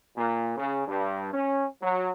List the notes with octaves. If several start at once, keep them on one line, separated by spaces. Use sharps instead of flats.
A#2
C#3
G2
C#4
F#3